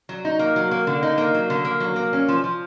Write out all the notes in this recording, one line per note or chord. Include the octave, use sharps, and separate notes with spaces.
F#3
D#4
A#3
F#3
A#3
D3
D#4
A#3
F#3
D3
A#3
F#3
A#3
C#4
F3
F3